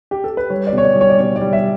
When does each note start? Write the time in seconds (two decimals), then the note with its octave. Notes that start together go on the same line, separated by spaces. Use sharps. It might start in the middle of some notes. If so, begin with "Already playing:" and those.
0.11 G4
0.24 A4
0.37 B4
0.50 G3 C#5
0.67 D5
0.73 B2 C#5
0.84 D5
0.96 G3
1.01 C#5
1.10 D5
1.18 B2 C#5
1.36 D5
1.41 G3
1.53 E5